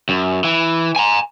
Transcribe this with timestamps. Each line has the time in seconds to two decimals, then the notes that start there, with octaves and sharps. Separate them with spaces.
0.09 F#2
0.44 E3
0.96 G#5 A#5